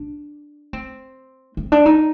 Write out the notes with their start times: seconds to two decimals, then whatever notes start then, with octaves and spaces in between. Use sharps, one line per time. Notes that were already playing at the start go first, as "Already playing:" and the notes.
Already playing: D4
0.73 C4
1.57 C4
1.72 D4
1.86 D#4